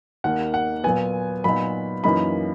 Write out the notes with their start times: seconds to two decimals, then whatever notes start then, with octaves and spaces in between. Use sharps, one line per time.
0.24 D#2 D#3 A#3 D#4 F#5
0.54 F#5
0.84 A#2 F#3 B3 G#5
1.44 A#2 F#3 B3 D#4 B5
2.04 F#2 E3 A#3 D#4 B5